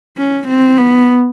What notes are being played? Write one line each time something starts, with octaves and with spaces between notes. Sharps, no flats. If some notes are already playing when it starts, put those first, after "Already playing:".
C#4
C4
B3